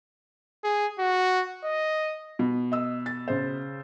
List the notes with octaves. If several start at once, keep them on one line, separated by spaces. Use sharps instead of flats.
G#4
F#4
D#5
B2
D#5 E6
A6
C#3 C5